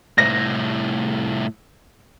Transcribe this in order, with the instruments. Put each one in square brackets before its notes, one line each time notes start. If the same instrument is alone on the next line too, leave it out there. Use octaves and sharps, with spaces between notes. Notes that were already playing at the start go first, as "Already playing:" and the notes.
[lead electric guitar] C2 A2 [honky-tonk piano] A#6